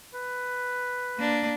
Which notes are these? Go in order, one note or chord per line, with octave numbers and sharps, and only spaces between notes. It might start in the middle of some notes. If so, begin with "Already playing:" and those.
B4
A#3 D4